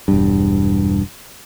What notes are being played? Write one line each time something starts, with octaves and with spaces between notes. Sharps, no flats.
E1 G2